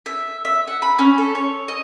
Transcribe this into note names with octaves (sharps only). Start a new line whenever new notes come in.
E5
E5
F#5
B5
C#4
A4
C#5
D#5